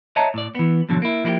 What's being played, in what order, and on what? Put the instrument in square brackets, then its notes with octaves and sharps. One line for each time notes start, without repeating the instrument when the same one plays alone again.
[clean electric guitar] C#5 D#5 E5 A5 A#5
A2 D5
E3 B3
G#2 B2 D3 F3 F#3
A#3 E4
F3 A#3 E4 F#4 G4